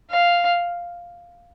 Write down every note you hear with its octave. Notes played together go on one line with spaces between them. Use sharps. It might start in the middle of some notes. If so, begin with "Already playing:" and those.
F5